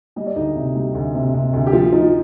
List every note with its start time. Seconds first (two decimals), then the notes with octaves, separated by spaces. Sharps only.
0.16 G3 D#5
0.26 D5
0.36 D2 D#4 D#5
0.55 C3
0.75 G3
0.94 D2
1.14 C3
1.34 C3
1.53 D2
1.66 G4
1.72 F3 F4
1.92 F3 D#4